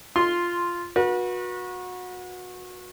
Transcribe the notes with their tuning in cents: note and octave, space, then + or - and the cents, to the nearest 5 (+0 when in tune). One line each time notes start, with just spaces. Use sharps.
F4 -5 C6 +0
F#4 -25 B4 -35